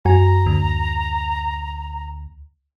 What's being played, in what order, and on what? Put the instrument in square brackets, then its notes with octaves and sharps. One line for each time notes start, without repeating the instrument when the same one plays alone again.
[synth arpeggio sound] F#2 F#4 G#5 [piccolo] A#5
[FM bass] D2